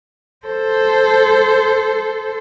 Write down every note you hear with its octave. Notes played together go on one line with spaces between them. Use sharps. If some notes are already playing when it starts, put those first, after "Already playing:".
A4 C5